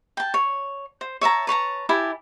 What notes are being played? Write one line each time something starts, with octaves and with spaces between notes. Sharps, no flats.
G5 A5
C#5
C5
C#5 E5 A5 A#5
B4 C#5 A5 A#5
E4 G4 G#5 A5